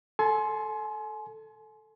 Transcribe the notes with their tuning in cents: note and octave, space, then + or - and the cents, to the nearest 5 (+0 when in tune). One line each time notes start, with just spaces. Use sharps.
A4 +0 G#5 +35 C6 +0